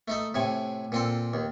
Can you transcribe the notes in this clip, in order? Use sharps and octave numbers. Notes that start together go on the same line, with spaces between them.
A3 D#4 A4
A2 C3 G#5
A#2 C4 A4
D#2